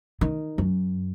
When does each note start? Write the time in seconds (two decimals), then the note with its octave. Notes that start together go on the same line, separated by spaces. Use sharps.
0.21 D#3
0.58 F#2